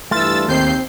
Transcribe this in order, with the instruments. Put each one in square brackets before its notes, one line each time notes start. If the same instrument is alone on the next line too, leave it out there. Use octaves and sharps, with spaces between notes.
[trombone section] G2 E3 [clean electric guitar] A3 F4 [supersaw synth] E6 A6
[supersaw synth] D#2 G6 C7 [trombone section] C4